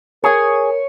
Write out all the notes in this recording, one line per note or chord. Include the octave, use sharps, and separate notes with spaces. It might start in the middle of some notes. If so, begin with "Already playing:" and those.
G#4 A#4 C#5 G#5